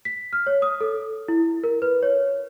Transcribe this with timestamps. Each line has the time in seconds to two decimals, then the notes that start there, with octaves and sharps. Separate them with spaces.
0.05 B6
0.33 F6
0.47 C#5
0.62 D#6
0.81 A4
1.28 E4
1.64 A#4
1.82 B4
2.03 C#5